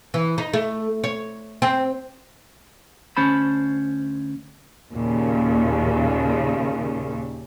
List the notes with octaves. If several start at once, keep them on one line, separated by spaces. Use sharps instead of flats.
E3
D#4
A3
C#5
C4
D2 C#4 C5 A5 B5
D#2 A#2 C#3